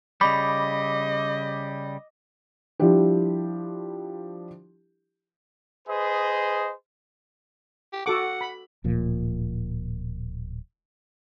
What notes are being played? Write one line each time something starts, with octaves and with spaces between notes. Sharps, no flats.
C#3 G3 D#5 B5 D6
F3 G3 D4 E4 G4
G#4 B4 C5 D#5
G4
F#4 A4 F#5 D6
B5
D1 A#2 F3